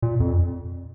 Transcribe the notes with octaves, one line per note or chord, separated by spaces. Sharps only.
A#2
F2